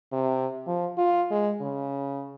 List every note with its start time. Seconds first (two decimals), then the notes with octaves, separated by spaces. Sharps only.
0.13 C3
0.67 F3
0.98 F4
1.31 G#3
1.61 C#3